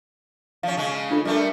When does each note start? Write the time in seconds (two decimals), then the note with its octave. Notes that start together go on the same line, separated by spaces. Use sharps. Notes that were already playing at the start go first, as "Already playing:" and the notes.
0.63 F3 C#4 F5
0.77 C#3 G#3 C#4
1.10 D4 F4 A4
1.25 G3 A3 A#3